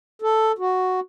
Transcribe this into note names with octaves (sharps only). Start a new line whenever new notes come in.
A4
F#4